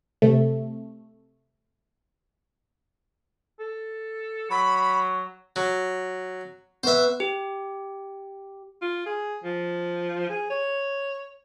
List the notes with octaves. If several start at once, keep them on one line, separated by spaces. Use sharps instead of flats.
C3 A3
A4
F#3 B5
F#3
B3 B4 C5 E5
G4
F4
G#4
F3
G#4
C#5